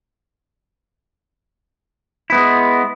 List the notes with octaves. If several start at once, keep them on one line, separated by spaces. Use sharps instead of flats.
G#3 B3 E4